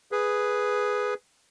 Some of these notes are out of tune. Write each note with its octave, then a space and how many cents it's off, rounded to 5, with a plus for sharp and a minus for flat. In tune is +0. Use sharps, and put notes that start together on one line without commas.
G#4 +0 B4 +0